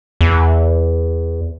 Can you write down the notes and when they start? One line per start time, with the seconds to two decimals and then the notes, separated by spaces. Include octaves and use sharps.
0.21 E2